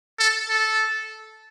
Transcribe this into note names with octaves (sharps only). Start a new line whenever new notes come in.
A4
A4